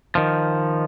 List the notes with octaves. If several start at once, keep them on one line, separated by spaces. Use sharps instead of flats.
D#3 F3